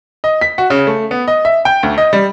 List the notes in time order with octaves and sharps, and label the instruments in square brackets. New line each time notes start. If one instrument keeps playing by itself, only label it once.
[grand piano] D#5
B6
F#4
C#3
A3
B3
D#5
E5
G5
D2
D#5
G3